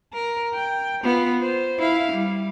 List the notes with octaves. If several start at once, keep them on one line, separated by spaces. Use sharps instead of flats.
A#4
G5
B3 F4
C5
E4 F5
G3